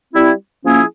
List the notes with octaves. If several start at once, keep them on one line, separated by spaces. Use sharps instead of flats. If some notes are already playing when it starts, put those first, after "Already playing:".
G3 C4 E4
F3 A#3 C#4 E4 G#4